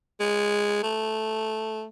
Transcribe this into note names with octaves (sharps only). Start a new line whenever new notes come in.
G#3
A3